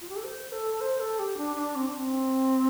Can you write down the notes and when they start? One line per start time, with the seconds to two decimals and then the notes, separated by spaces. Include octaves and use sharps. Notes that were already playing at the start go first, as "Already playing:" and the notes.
0.01 F4
0.09 G4
0.16 A4
0.24 C5
0.52 A4
0.81 C5
1.00 A4
1.19 G4
1.37 D4
1.56 D4
1.75 C4
1.87 D4
1.99 C4